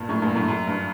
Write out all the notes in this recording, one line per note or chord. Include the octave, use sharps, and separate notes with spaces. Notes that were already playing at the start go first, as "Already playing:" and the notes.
Already playing: G2 A#2
F#2 A2
G2 A#2
F#2 A2
F#2
G2